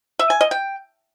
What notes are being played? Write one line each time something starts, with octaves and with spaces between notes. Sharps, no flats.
E5
G#5
D#5
G5